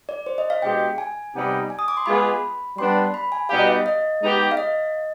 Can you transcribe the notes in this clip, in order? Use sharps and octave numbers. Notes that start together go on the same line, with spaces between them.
D5
C5
D#5
F5
B2 G#3 D4 G4 G5
G#5
C3 G3 B3 D#4 G4
G#5
D#6
D6
C6
G#3 B3 F4 G#4 B5
G3 B3 D4 C6
B5
G#5
B2 G3 B3 D#4 G4 F5
D#5
F5
D#5
G#3 B3 D#4 G4
F5
D#5